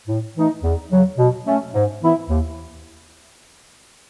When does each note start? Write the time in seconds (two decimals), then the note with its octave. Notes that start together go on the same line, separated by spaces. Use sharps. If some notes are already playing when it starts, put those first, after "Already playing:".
0.08 A2
0.36 E3 A3 D#4
0.63 E2
0.91 C#3 F#3
1.18 B2
1.46 A3 C#4
1.74 G#2
2.01 E3 B3 E4
2.29 D#2